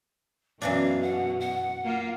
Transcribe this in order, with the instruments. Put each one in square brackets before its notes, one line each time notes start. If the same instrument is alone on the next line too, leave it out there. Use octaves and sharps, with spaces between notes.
[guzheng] F#2 E3 D4 [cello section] B2 [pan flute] F5
[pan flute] F#5
F#5
[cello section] A#3 F4